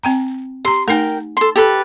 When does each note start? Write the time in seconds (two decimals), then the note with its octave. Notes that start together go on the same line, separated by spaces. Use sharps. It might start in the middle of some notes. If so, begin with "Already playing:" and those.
0.03 C4 G5 A#5
0.65 G4 A#5 C6
0.88 A3 D#4 A#4 G5 G#5
1.37 A4 C6
1.56 G4 A4 B4